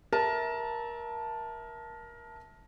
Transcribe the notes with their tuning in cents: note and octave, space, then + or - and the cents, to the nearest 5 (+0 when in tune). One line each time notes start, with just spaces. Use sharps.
A#4 +20 E5 -15 A5 +0